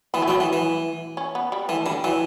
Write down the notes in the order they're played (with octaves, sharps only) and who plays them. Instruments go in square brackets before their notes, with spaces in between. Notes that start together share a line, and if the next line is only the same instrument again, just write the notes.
[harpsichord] E3 [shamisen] B3
[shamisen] A3
[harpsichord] F#3 [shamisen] B3
[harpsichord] E3
E3
[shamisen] C#4
B3
G3
[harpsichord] E3 [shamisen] A3
[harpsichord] D3 [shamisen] G3
[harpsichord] E3 [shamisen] F#3